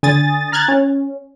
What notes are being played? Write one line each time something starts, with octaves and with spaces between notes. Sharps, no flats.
D3 G#5 D#6 A6
A#5 F6 F#6 G#6 A6
C#4